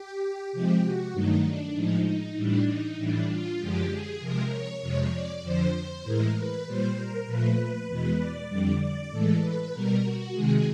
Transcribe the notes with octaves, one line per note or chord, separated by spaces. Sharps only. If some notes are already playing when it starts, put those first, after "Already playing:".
Already playing: G4
C3 F3 G#3 G4
F#4
G2 D#3 F#3 A3 D#4
D4
A2 F3 G#3 D#4
D#4
A2 E3 G3 D4
D#4
A2 E3 G3 D4
F4
F#2 D3 F3 G#3 G4
G#4
C3 F3 G#3 A#4
C#5
F2 C3 F3 G#3
D5
F2 D3 F3 C5
A2 E3 G#3 A#4
B4
A#2 G3 C5
A#4
A#2 F3 A3 B4
E2 B2 G#3
D5
F2 D3 G3
D5
A2 E3 G#3 A4
B4
B2 G3 A#4
F#4
C3 D#3 G#3 G#4